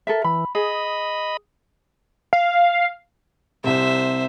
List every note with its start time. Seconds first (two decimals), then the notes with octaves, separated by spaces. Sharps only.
0.07 A4 A#4 E5
0.24 E3 B5
0.55 G#4 D#5 B5
2.33 F5
3.64 C2 C3 C5 E5